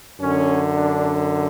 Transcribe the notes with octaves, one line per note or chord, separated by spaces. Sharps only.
F#2 D3 C#4
D4